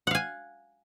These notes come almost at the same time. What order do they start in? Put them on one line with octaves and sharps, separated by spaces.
F#5 F5 G#5